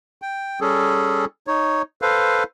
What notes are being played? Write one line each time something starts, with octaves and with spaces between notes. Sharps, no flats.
G5
G3 C#4 G#4 A4
D#4 C#5
A4 B4 C5 F5